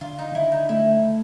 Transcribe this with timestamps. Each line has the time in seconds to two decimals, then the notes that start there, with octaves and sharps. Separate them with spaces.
0.01 D3 F4
0.19 D#4
0.35 D3 E4
0.52 D#4
0.69 A3 E4